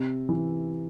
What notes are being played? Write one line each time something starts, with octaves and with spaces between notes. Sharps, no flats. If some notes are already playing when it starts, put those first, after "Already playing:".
Already playing: C3
E3